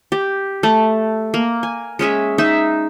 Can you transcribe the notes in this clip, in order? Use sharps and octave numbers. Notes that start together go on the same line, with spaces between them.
G4
A3
A#3
G#5
G#3 C#4 G#4 E5
D#4 E5